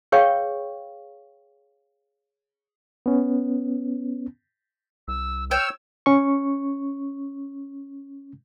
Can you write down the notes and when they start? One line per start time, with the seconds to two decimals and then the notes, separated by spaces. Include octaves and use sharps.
0.12 G#4 B4 C#5 F5 G5 C#6
3.06 B3 C#4
5.08 C2 E6
5.51 C#5 G5 E6 F6 G6
6.06 C#4 C#6